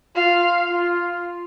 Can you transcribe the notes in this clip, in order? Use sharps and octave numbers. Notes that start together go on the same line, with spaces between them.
F4 F5
F4